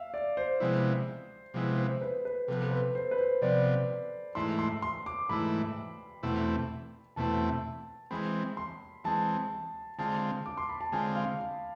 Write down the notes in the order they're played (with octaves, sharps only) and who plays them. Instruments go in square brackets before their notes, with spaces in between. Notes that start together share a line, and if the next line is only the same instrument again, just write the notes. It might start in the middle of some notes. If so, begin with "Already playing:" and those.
Already playing: [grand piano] E5 F5
D5
C5
[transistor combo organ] C3 F3 G#3 B3 E4
C3 F3 G#3 B3 E4
[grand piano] C5
B4
B4
[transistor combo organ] C3 F3 B3 [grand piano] A4
[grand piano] A4
B4
C5
B4
C5
[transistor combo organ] C3 F3 B3 [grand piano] D5
[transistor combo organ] G#2 E3 A3 E4 [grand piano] C6
[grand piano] C6
C6
D6
[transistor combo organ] G#2 E3 A3 E4 [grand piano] B5
[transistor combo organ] E2 B2 A3 C4 E4
[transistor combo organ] E2 B2 A3 C4 E4 [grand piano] A5
[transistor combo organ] E3 G#3 C4 [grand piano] B5
[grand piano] C6
[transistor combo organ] E3 G#3 C4 [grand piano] A5
[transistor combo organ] D3 G#3 C4 F4 [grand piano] A5
[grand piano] D6
C6
B5
A5
[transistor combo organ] D3 G#3 C4 F4 [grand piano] G#5
[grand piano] F5